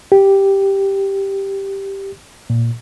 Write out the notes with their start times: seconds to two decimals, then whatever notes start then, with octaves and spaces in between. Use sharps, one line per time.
0.12 G4
2.50 A#2